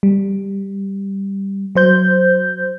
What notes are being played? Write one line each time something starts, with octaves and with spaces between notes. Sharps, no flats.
G3
F#3 C5 G6